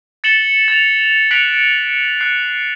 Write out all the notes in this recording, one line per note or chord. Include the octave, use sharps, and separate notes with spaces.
A6 C#7 E7 F#7 G7
A6 F7
F#6 B6 C#7 D7 F7 F#7
F7
F#6 C7